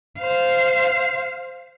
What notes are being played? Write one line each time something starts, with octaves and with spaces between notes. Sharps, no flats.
C5 F5